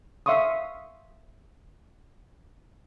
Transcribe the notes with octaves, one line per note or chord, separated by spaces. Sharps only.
E5 F5 C6 C#6 D#6